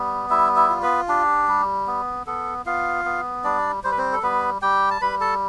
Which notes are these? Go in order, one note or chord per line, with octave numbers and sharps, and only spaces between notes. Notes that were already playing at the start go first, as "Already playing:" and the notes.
Already playing: G3 B3
G3 E4 E5
E4 E5
F4
B3 B4
D4 G4
G3
B3
B3 A4
B3 F4 F5
B3
G3 D4 D5
G3 C5
B4
C4 C5
A4
G3 B3 B4
G3 G4 G5
A5
G3 B4 B5
A4 A5